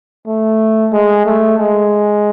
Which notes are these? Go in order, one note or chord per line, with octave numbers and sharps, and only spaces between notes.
A3
G#3
A3
G#3